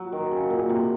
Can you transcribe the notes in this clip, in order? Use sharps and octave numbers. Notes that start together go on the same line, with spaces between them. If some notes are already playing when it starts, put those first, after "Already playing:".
Already playing: F#3
D#3
C#3
A#2
C3